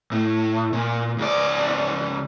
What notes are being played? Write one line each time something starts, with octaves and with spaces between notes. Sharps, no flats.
A2
A#2
C#2 D5